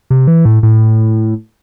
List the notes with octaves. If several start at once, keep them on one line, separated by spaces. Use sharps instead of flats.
C3
E3
A2
A2